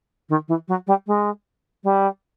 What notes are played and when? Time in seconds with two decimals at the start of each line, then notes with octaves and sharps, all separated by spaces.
0.29 D#3
0.48 E3
0.68 F#3
0.87 G3
1.07 G#3
1.84 G3